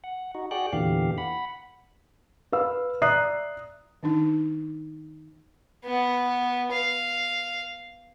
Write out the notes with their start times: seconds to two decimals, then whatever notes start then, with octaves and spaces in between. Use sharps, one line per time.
0.04 F#5
0.35 D#4 F#4
0.51 F#4 G#4 D5 F#5 G5 F#6
0.73 E2 A#2 D3 E3 G4 F5
1.18 F#5 B5
2.52 B4 F5 E6
3.02 D5 E5 A#5 D#6 F#6 C7
4.03 D#3 D4 D#4
5.84 B3
6.72 F5